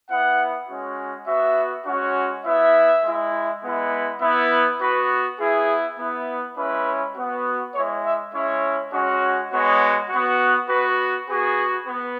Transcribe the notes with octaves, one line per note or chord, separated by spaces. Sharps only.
B3 E4 F#5
G#3 C#4 F#4
B3 F#4 E5
G#3 C#4 F#4
B3 E4 E5
G#3 E4
G#3 B3 E4
B3 E4
B3 F#4 B4
B3 E4 G#4
B3 E4
G#3 C#4 E4 B4
B3 F#4
G#3 E4 C#5
E5
G#3 C#4 E4 C#5
G#3 C#4 F#4
G#3 B3 F#4 C#5
F#4
B3
B3 F#4 B4
B3 F#4 G#4
B3